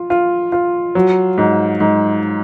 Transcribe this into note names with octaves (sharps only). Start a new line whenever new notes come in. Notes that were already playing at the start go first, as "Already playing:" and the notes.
Already playing: F4
F4
F4
F#3
G#2
G#2